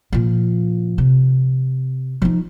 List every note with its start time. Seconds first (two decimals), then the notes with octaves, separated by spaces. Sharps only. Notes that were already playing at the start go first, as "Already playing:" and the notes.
0.13 A#2 F3
0.98 C3
2.22 F3 D#4